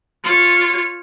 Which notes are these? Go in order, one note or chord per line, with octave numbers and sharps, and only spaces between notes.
F4 C#5